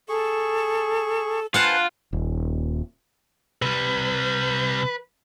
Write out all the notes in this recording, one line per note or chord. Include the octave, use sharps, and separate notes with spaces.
G#4 A4 C#6
F4 B4 C5 F5 F#5 G#5 A5 F#6
D#1
C3 G3 B4